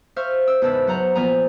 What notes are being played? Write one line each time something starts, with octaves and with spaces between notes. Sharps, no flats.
C5 E5 F5 C#6 F6
E6
E2 G#2 C#3 B4 A5 E6
F#3 C5 F#5 A#5
A#2 F3 B3 G#5 A#5